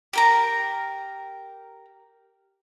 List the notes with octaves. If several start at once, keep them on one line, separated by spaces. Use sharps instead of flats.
G4 A#4 A#5